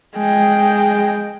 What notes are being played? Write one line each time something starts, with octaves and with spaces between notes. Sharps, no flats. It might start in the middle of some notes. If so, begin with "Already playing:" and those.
G#3 G5